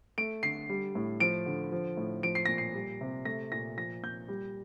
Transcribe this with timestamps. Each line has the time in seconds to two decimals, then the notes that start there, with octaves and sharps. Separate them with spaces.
0.18 A3 D7
0.43 D3 C7
0.69 G3
0.95 A2
1.20 F3 D7
1.46 D3
1.72 F3
1.97 A2
2.23 F3 D7
2.35 C7
2.46 A#2 A#6
2.58 C7
2.74 G3
3.01 C3
3.25 A3 A#6
3.52 A#2 A#6
3.77 F3 A#6
4.03 A#2 G6
4.28 G3